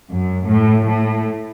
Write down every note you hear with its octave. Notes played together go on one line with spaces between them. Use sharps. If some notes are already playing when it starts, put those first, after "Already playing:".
F#2
A2
A2